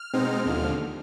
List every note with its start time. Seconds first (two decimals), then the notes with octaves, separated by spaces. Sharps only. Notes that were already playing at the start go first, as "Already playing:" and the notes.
Already playing: F6
0.13 B2 G#3 C4 D#4
0.45 D#2 D3 F3